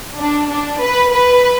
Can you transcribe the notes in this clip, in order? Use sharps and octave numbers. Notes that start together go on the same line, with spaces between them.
D4
D4
B4
B4